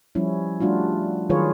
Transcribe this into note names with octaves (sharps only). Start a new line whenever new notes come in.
F3 G3 C#4 E4
G3 A3 D4 F4 F#4
D#3 F#3 F4 G#4 B4 C#5